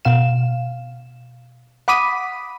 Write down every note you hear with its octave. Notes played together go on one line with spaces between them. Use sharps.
B2 F5 E7
F#5 B5 D6 D#6 B6 D#7